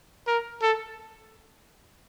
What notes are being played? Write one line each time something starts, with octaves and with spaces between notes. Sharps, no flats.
A#4
A4